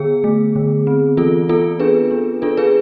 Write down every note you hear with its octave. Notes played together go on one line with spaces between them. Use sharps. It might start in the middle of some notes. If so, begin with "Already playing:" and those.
Already playing: D3 B3 G#4
A3
D3
C4
E3 F4 A4
B3 F4 A4
D4 G#4 B4
D4
D4 F4 A4
G#4 B4